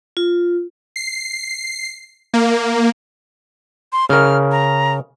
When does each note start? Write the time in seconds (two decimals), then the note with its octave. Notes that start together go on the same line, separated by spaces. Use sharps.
0.17 F4
0.96 C7
2.34 A#3
3.93 C6
4.09 C#3 A#4 F6
4.52 A#5